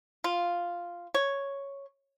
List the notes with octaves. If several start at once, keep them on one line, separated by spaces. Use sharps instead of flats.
F4
C#5